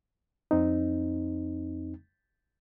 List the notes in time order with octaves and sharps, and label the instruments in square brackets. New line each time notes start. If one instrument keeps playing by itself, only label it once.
[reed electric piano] F2 C4 D#4